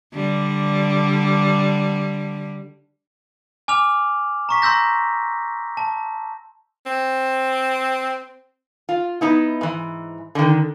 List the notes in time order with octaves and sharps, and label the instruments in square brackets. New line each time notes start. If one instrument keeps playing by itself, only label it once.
[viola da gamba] D3 G3
[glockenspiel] G#5 D6 F6 F7
A#5 C#6 B6
A#5 C6 E6 G6 A#6
A5
[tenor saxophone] C4
[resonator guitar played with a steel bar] F4
B3 D#4 E4
G#2 E3
D3 D#3